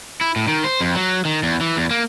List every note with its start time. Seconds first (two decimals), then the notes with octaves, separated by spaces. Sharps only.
0.21 E4
0.36 A2
0.48 D#3
0.64 C5
0.81 F2
0.96 F#3
1.25 D#3
1.43 E2
1.61 E3
1.77 E2
1.91 A#3